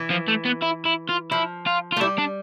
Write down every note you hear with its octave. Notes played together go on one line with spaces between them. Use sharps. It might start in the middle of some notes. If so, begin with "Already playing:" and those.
Already playing: E3
F3
A3
B3
E4
E4
F4
F3 E4
F4
F4
A3
G3 E4
D4